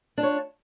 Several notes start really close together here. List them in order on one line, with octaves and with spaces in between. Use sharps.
D4 F4 C#5